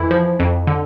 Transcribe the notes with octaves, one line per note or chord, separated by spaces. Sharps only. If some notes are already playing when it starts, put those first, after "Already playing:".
Already playing: F2 E3 E4
F3
F2
D3